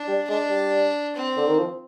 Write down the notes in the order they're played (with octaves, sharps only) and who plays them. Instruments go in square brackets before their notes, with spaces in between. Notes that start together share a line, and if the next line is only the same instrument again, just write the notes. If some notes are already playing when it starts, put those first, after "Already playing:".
Already playing: [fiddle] D4
[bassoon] G3
[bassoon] G#3 [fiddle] D4
[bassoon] G3
[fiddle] C4
[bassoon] D3
D#3
F3